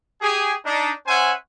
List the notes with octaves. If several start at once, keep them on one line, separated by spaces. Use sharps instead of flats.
G4 G#4
D4 D#4
C#4 C5 E5 F#5 G#5